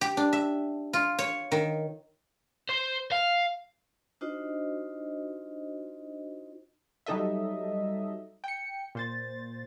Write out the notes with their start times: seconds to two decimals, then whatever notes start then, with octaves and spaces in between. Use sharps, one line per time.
0.01 G4
0.17 D4
0.33 E5
0.93 F4
1.19 C#5
1.52 D#3
2.69 C5
3.12 F5
4.21 D4 D#4 F4 F#4 C5 D#5
7.06 F#3 G3 D#4 A4 D#5 E5
8.44 G5 C#7
8.95 A#2 C5 A6